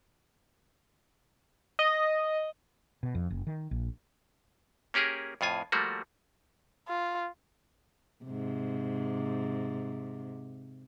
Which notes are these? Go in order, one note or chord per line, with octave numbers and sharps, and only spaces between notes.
D#5
B2
F2
F#1
D#3
A#1
A#3 C#4 G4 G#4 A#4
F2 A2 F4 G#5
F3 G3 A3 A#3 F#4
F4
G#2 C3